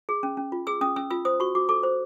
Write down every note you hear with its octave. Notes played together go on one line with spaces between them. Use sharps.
G#4
C#4
C#4
F4
G#4 E6
C#4 D#6
C#4 E6
F4 E6
C5 D#6
F#4 C#6
F#4 D6
A4 D6
C5